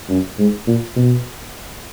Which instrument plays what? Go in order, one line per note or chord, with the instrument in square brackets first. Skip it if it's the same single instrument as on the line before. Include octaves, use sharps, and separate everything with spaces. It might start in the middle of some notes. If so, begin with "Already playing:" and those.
[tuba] F#2
G#2
A#2
B2